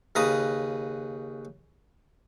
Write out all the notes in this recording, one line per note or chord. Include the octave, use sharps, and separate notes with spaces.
D#2 C#3 B4 A#5 D#6